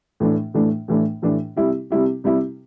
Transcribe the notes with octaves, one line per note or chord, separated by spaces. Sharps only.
A2 E3 A3 D4
A2 E3 A3 D4
A2 E3 A3 D4
A2 E3 A3 D4
C3 G3 E4 G4
C3 G3 E4 G4
C3 G3 E4 G4